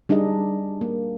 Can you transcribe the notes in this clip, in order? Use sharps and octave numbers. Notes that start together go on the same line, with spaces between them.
G3 D4 D#4 G#4 D#5
A#3